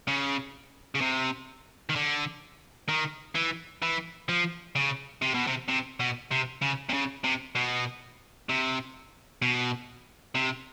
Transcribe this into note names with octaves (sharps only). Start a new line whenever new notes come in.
C#3
C#3
C3
D#3
D3
D#3
E3
E3
F3
C#3
C3
B2
C3
C3
B2
C3
C#3
C3
C#3
C3
B2
C3
B2
C3